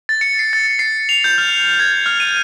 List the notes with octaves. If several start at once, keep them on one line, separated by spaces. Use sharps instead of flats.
A6
C#7
C7
A6
C7
F7
G6
F6
G#6
F6
D#7